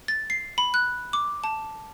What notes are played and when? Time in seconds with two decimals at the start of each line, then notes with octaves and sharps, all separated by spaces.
0.08 A6
0.30 C7
0.58 B5
0.74 F#6
1.13 D6
1.44 A5